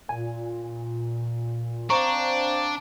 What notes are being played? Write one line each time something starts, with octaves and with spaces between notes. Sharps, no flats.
A#2 G#5
C4 D4 C5 F5 A#5 C#6